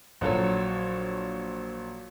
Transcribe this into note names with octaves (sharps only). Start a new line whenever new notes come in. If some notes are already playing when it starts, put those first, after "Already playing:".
A#1 F#3 A4 C#5